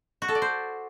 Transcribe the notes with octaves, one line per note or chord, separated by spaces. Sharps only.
F#4
A4
D5
C5